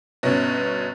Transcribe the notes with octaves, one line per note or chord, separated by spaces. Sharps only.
G1 B2 C#4 A#6